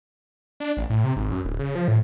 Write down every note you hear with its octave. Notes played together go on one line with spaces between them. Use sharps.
D4
A1
A2
C3
G#1
F#2
D1
C#3
F3
A2